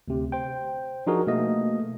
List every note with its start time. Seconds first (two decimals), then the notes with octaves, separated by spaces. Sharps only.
0.08 D2 C3
0.32 C5 G5
1.07 F3 D4 D#4 F#4 G#4 A#4
1.27 B2 A3 A#3 D#5